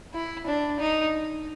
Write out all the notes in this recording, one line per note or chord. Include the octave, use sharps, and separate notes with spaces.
E4
D4
D#4